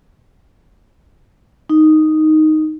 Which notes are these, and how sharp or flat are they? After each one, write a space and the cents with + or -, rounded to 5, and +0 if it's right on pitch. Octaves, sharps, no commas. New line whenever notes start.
D#4 +0